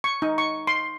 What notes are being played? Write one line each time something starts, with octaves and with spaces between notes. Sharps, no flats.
C#6
D#4
C#6
C6